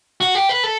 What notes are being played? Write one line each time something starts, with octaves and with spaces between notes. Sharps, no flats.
F#4
G4
B4
A4